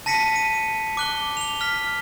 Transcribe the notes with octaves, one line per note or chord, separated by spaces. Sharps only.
A5 A#6 B6 C#7 D#7
D#7
D6 F#6 G7
F7 G7
F6 B6